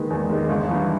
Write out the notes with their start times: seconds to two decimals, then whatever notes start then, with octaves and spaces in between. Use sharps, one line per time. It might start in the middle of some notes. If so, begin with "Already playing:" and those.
Already playing: D#3 G#3 B4
0.10 E2
0.29 D#3 G#3
0.48 G1
0.69 G2 E3